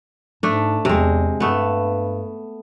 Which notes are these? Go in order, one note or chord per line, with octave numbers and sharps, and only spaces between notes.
G#2 A3 D4
E2 C3 G#3
G2 A3 B3